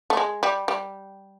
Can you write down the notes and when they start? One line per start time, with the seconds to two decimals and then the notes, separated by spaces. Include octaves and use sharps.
0.10 A3
0.17 G#3
0.43 G3
0.68 G3